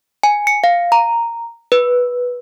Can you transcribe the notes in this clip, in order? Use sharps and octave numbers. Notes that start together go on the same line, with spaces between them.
G#5
C#7
F5
A#5
B4